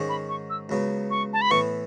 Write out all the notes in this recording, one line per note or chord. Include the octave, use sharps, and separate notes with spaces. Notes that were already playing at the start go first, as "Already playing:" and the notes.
Already playing: G#2 D#3 G#3 C#4
B5
C#6
E6
C#2 C#3 F#3 B3
C#6
A5
B5
A2 E3 B3 C#6